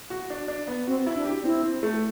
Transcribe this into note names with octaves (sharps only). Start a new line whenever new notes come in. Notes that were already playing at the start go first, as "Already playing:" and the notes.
F#4
D4
D4
B3
C4 F#4
E4
D4
G4
C4 E4
C4
A3